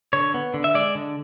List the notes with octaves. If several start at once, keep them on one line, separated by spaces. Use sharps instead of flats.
D3 C#5
B3
D3
E5
G#3 D5
D3